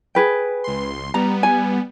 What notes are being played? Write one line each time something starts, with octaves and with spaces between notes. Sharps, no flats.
G#4 B4 G5
C#2 C6
G3 B3 A#5
G#5